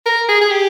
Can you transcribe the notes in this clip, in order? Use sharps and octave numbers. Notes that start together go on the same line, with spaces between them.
A#4
G#4
G#4
G4